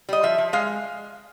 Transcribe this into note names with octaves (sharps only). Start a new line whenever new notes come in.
G3 D#5
F3 E5
F3
G#3 F5